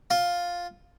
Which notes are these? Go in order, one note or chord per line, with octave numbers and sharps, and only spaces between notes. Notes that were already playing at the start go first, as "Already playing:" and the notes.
F4